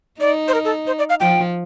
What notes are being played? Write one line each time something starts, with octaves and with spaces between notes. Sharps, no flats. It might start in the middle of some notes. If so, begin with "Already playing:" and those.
D#4 D5
C5
A#4
A4
C5
D5
F5
F3 G5